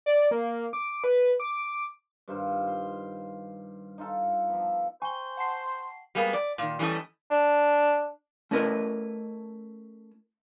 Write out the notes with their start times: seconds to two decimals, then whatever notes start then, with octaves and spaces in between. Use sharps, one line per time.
0.06 D5
0.31 A#3
0.73 D6
1.04 B4
1.40 D6
2.28 G2 D#3 F4 C5
2.68 C6
3.98 D#4 F4 A4
4.49 F3 B3
5.02 C5 G5 G#5 A#5 C#6 G7
5.37 F#5 A5 C6 C7
6.15 G3 G#3 A#3 B3
6.33 D5
6.58 A#2 D#3
6.79 E3 G3 A3 C#4 A4 D#5
7.31 D4
8.51 A3 C#4 E4 A#4 B4 D#5